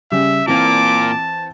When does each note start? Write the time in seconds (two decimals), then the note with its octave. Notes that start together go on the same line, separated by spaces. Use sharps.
0.12 C#3 G3 E5
0.48 A#2 E3 A#3 C4 A5 D6